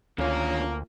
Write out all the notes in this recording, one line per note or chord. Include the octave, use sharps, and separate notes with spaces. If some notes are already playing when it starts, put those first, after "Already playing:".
D2 D3 D#3 A#3 C#4 F4 C#5